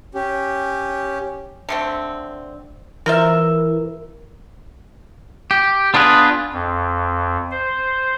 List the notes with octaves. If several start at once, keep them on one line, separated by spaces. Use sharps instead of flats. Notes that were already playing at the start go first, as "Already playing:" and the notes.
C#4 G4
D3 A3 C4
E3 F4 A#4 C5 E5
G4
B3 D4 F4 G#4 B4
F2
C5